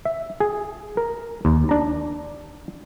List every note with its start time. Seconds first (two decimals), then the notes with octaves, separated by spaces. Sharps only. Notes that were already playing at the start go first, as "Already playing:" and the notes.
0.05 E5
0.40 G#4
0.97 A#4
1.45 D#2
1.69 D4 A#5